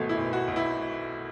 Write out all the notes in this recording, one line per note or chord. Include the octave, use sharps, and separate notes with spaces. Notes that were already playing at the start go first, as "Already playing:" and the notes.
Already playing: G#1 B2 A3
E4
B1
F#4
B1
E4